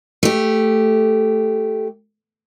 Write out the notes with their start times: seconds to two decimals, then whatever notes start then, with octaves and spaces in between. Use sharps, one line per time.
0.23 A3 G4